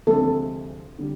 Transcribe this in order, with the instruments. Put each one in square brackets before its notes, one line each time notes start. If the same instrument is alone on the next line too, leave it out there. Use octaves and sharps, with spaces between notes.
[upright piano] D2 C3 F3 G#3 [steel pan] A4
[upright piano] D3 G3